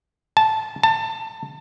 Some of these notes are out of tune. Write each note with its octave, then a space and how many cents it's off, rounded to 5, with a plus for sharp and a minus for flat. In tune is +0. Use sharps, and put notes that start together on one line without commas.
A5 -10
A5 +25